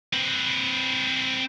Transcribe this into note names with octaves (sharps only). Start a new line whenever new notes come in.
C4 B4